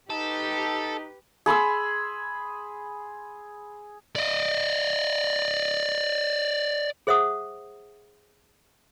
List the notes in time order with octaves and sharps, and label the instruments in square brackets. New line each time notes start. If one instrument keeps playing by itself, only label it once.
[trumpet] D#4 [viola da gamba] G4 B4 [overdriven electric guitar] A4
[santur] G#4 B5 C6 E6
[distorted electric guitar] D5 D#5
[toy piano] G#4 C5 E5 F#5 D#6